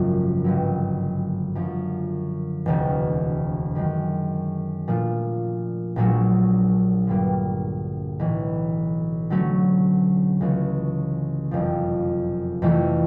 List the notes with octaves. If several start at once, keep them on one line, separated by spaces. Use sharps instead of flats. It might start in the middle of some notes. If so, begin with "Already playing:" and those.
Already playing: G#1 F#2 C#3 F3 A#3
G#1 G2 D3 F#3
F#2 D3 F3
E1 D2 C3
F#2 D#3 G#3
A#2 F3 A3 D4 F4
A#1 A#2 F#3 A3 D4
G2 D3 G3 A#3
B1 A2 E3
D3 F#3 A3 C#4
C#2 C#3 E3 A3
F#1 F2 C3 F3
F2 C3 E3 A3